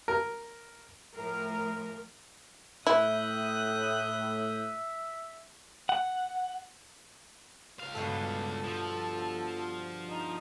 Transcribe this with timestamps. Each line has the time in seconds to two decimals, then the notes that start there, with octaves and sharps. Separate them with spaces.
0.08 A#4
1.15 A2 F3 A#4
2.87 A2 E4 E5 D#6 F#6 G6
5.89 F#5
7.79 C#2 F5
7.95 G2 B2 D3 A4
8.64 F3
10.10 D#4